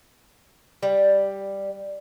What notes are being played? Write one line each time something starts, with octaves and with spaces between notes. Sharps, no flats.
G3